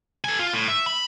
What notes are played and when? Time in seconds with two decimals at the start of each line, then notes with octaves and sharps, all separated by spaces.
0.24 A4 G#5
0.39 F4
0.53 A2
0.68 E5
0.86 B5